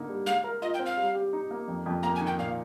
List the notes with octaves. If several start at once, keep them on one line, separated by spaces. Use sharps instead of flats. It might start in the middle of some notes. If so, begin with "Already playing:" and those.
Already playing: D3 A#3 D#4
G3
G#3 F5
A#4
F4 D#5
G5
C4
F5
G3
G4
D#4
A#3
F2
F2
A#3 A#5
G#5
D#3
G5
A#2 F5